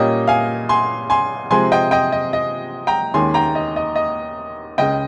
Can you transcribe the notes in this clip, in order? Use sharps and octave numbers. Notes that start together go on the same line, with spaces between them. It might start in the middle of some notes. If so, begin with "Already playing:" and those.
Already playing: A#2 G3 A#3 C#4 D#5 G5
F5 G#5
G#5 C6
G#5 C6
C3 F3 G#3 C4 G#5 C6
D#5 G5
D#5 G5
D#5
D#5
G5 A#5
D#2 D#3 G#3 C#4 G#5 C6
G5 A#5
D#5
D#5
D#5
C#2 C#3 G#3 D#5 G5